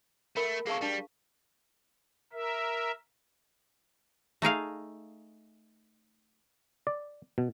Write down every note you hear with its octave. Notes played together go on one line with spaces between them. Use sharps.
A3 A#4 F#5 B5
A#3 G#4 A4 F5 C#6
G3 D4 A5
A#4 E5
A3 D#4 G#4 F5
D5
B2